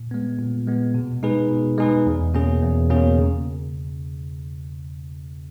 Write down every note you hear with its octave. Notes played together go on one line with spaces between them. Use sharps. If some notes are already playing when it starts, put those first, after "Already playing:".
Already playing: A#2
G#3 B3
A#2
G#3 B3
B2
G#3 D#4 G#4 B4
B2
G#3 D#4 G#4 B4
E2
B2 A#3 C#4 G#4
E2
B2 A#3 C#4 G#4
C#3